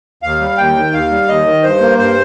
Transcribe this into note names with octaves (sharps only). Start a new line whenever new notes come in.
D#2 F5
G3
D#2 G5
D#3
D#2 F5
G3
D#2 D#5
D#3
G2 C5
A#3
G2 C5